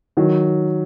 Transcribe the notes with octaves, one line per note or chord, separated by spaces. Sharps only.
D#3 F#3